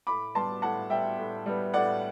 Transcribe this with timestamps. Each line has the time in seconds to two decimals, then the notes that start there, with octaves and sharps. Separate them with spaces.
0.07 A2 B5 D6
0.35 G3 B3 A5 C6
0.62 A2 F#5 A5
0.90 G3 B3 E5 G5
1.18 A2
1.46 G3 B3
1.74 A2 D5 F#5